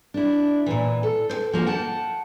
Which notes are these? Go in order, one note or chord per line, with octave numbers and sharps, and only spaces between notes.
D4 E4
A#2 E3
A4
C5 G5
F#2 F3 A#3 F#4
F#5 G5 A5